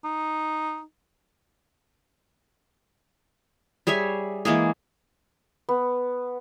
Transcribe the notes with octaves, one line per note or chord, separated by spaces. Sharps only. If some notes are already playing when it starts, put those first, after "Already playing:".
D#4
G3 G#4 C#5 E5
E3 G#3 A#3 G#4
B3